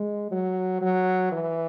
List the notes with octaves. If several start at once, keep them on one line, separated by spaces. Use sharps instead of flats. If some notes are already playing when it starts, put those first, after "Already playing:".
Already playing: G#3
F#3
F#3
E3